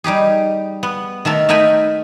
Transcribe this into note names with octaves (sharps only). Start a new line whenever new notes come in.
G3 D#4 G4 G#4
B3
D#3 A3 A4 A#4
A3 D#4 A#4 G5 G#5 B5